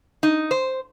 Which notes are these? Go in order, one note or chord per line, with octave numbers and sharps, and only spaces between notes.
D#4
C5